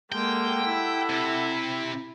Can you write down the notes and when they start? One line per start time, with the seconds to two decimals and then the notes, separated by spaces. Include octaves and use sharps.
0.12 G#3 A#3 G4 A4 F#5 G5
0.66 E4
1.10 C3